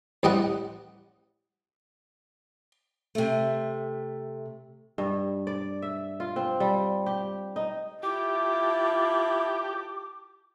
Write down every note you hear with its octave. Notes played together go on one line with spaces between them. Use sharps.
A1 G3 D#5 F#5
C3 A3
G2
D5
E5
F4
C4
G3
G4
D#4
E4 F4 G4 A5 D6